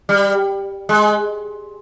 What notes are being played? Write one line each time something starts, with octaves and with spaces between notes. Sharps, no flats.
G3
G#3